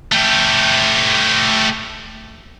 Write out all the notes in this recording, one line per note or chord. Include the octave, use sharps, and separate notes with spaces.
A3 G4